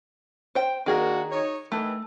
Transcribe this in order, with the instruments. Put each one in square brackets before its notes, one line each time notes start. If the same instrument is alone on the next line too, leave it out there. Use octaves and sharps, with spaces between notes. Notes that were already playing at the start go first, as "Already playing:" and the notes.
[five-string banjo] C5 G5
[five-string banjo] D#3 G#4 A#4 [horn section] A#3 D4 F#4
[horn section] D#4 C#5
[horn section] D#3 E3 [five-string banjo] A3